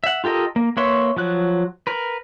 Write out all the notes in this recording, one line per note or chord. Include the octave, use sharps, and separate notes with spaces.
E5 F#5
F4 G4 A4 A#4 D#5
A#3
A#3 B4 C#5 E5 C6
F3 F#3 F#6
A#4 B4